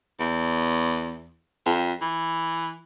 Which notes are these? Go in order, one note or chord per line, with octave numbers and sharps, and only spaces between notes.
E2
F2
E3